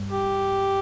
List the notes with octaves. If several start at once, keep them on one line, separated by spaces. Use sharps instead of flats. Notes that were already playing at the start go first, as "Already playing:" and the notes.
Already playing: G2
G4